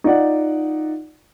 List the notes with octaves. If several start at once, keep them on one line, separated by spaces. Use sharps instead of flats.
D#4 F4 D5 F#5